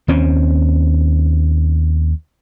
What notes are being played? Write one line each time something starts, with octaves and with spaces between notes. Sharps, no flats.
D#2 C4 C#4